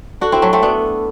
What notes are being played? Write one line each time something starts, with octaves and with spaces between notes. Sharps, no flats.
D4 F#4 A4
C4 E4
F#3 A3
A3 C4
B3 D4